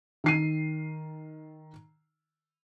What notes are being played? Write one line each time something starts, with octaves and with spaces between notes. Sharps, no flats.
D#3 C7 D#7